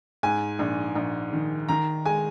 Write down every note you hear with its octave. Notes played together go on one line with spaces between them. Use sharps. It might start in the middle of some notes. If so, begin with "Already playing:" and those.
G#2 G#5
A#1
A#1
D#3
D#3 A#5
G#3 G#5